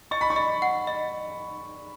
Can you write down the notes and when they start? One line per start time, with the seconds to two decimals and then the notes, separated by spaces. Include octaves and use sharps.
0.11 D#5 C#6
0.21 B5
0.30 C#6
0.36 D#5
0.62 F#5
0.87 D#5